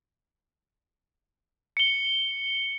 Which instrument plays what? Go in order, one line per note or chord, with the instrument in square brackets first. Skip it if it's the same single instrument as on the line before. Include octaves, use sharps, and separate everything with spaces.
[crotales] C#7 G7